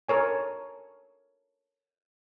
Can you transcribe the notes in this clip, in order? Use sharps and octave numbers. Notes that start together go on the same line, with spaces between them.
A4 A#4 C#5 G#5